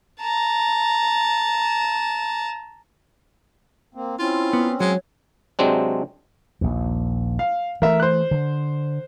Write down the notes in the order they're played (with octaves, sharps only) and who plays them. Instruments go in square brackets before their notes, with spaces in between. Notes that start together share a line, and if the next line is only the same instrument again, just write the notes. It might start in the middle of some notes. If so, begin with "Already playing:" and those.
[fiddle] A5 A#5
[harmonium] A#3 C4
[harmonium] C4 C#4 [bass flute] E4 [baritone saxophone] F4
[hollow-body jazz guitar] B3
[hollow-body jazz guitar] F#3 [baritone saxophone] G#3 [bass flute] C#5
[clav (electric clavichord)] C3 F#3 G#3 C4 D4
[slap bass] A#1 D#2
[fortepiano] F5
[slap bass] E3 A3 [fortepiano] A#4 E5
[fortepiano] C5 F#6
[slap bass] D3